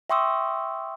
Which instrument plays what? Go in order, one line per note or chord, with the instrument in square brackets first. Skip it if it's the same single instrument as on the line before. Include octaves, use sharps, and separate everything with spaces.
[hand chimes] E5 G5 C6 C#6 D#6 E6